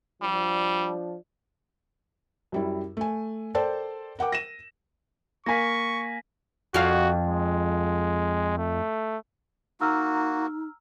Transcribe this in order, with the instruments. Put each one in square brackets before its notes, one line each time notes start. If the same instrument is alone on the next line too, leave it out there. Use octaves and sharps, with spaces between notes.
[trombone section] F3 D4 [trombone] G3
[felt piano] F#2 G3 E4
A3 G#5
A4 A#4 C5 D5 G5 A5
A#4 F#5 G5 D6
A#6 D#7 E7
[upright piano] A#3 G#5 [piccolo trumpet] C#6 [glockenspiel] A#6 B6
[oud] F2 F5 [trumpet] F#4
[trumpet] G#3
A3
[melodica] A#3 F#4 [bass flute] D#4 [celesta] A#5 E6 F6